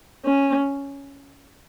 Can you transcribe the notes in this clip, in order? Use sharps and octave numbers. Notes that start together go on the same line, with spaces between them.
C#4